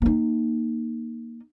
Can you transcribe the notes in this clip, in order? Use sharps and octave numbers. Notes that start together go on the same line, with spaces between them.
A#3 D#4